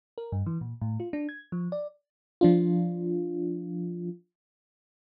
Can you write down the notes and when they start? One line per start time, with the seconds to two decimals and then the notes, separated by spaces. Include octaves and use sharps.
0.18 A#4
0.32 G2
0.46 E3
0.61 A#2
0.81 A2
1.00 F4
1.13 D4
1.29 G#6
1.52 F3
1.72 D5
2.41 F3 D4 F4